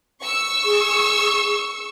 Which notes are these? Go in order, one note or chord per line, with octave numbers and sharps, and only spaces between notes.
C#6 E6
G#4